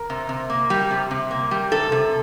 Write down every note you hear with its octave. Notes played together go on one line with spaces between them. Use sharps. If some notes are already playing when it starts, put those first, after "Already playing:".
Already playing: A#4
C3
C3
A#3
G3
C3
C3
A#3
G3
C3 A4
C3